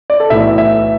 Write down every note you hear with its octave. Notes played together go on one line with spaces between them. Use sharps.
D5
A4
B1 A2 E3 E5
E5